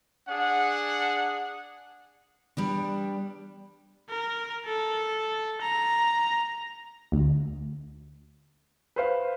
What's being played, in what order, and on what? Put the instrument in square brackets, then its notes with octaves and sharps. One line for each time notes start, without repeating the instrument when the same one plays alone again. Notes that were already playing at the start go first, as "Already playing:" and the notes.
[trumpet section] D4 G#4 F#5
[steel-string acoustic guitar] G3 B3 D4
[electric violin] A#4
A4
A#5
[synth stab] D2
[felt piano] B4 C5 F5